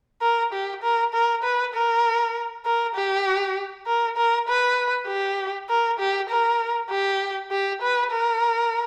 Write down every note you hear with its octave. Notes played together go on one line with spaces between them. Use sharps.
A#4
G4
A#4
A#4
B4
A#4
A#4
G4
A#4
A#4
B4
G4
A#4
G4
A#4
G4
G4
B4
A#4